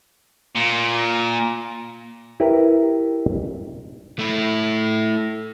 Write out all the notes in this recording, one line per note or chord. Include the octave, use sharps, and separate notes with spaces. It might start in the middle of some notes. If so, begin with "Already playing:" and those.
A#2
E4 G4 A#4 B4
A3 E4